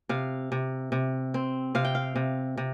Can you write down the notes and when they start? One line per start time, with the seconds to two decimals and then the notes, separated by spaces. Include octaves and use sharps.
0.09 C3 F5
0.52 C3
0.92 C3
1.34 C4
1.75 C3 F5
1.85 G5
1.95 F5
2.16 C3
2.57 C3